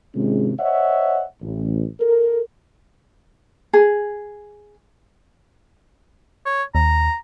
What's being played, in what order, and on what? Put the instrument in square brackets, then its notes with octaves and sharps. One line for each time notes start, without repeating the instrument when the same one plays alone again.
[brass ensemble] G#1 C3 G#3 C#4 F4 G#4
C5 C#5 D#5 E5 F#5
A1
A4 A#4
[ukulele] G#4
[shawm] C#5
[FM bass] D#2 [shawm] A#5